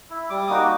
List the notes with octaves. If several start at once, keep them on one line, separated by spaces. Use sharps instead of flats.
E4
G3 D6
A#3 D#4 F#4 D#6
D6